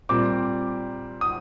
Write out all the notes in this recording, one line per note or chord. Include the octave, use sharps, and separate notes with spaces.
A#2 G3 C4 D6
D#6